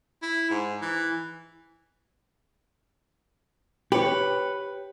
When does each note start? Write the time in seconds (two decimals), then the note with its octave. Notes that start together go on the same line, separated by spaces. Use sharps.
0.22 E4
0.51 G#2
0.82 E3
3.92 G4 B4 C#5